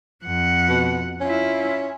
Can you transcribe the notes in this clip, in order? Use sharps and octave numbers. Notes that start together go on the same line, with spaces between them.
F2 F#5
B2
C#4 E4 F4